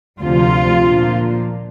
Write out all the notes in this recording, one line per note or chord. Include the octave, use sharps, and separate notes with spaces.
D2 C3 F3 F4
A#2 F3 A#3 D4